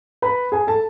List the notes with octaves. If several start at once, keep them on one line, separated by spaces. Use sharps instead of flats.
B4 B5
G#4 G#5
A4 A5